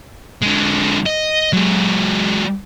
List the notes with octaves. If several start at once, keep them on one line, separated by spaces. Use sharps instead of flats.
D3 G#3
D#5
F#3 G#3